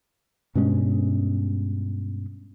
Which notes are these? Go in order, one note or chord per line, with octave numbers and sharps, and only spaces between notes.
G2 B2 G#3 C#4